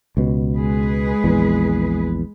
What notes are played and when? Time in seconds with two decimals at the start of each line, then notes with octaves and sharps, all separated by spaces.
0.17 C#2 B2
0.55 G#3 G#4 B4
1.24 A#1 E2